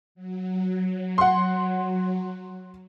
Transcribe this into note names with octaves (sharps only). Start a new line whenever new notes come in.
F#3
F#5 C6